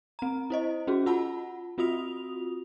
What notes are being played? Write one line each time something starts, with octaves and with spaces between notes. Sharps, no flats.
C4 A#5
E4 C5 D#5
C#4 F#4 G#4
F4 F#5 A5 B5
C4 F4 F#4 D#6 F7